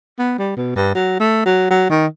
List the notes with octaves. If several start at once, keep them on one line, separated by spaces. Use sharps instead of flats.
B3
G3
B2
G2
F#3
A3
F#3
F#3
D#3